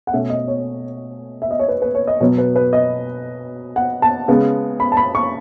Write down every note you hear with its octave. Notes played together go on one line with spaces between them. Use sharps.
F#5
B2 A3 C#4 E5
D#5
C#5
E5
D#5
C#5
B4
B4
C#5
D#5
B2 F#3 B3 C#5
B4
B4
D#5
F#5
A5
C#3 G#3 B3
B5
A5
B5
C#6